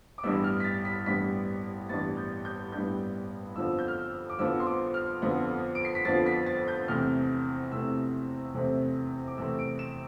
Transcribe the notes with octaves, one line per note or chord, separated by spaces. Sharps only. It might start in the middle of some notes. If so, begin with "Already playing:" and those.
D6
A1 G2 E3 G3 B3 E6
F6
B6
A6
B6
A1 G2 E3 G3 B3 B6
A1 G2 E3 G3 B3 A6
G6
G6
A1 G2 E3 G3 B3 G6
F2 D3 F3 B3 E6
G6
F6
E6
D6
F2 D3 F3 B3 E6
C6
D6
F6
F2 D3 F3 B3
D7
C7
B6
F2 D3 F3 B3 A6
B6
A6
G6
E2 C3 E3 A3 C4 F6
E2 C3 E3 A3 C4 E6
E2 C3 E3 A3 C4
D6
E2 C3 E3 A3 C4 E6
D7
E7